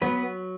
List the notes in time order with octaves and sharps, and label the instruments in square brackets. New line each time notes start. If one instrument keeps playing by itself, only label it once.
[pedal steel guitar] F#3 B3 B4